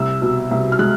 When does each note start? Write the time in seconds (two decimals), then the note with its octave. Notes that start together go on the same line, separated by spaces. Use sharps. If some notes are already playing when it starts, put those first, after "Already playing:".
Already playing: C2 E6
0.22 B2
0.51 C2
0.72 F6
0.79 G#3 F#6